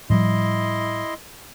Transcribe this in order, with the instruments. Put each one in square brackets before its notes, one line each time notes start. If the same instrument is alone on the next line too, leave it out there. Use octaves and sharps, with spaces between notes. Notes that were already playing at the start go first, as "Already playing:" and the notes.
[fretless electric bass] A2 F3 G3 [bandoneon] E4 D#5 C6